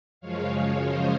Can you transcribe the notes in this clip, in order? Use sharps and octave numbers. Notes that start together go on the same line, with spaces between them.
F#2 C#3 F3 G#3 C#5 F5
C5 D#5